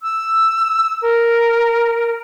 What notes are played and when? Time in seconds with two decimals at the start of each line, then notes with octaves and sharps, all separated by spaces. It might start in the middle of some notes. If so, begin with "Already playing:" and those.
0.01 E6
1.02 A#4